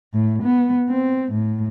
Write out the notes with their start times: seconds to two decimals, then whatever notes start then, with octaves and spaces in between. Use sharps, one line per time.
0.14 A2
0.43 B3
0.89 C4
1.32 A2